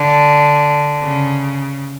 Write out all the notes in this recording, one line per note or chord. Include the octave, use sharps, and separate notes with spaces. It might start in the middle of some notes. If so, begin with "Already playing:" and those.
Already playing: D3
C#3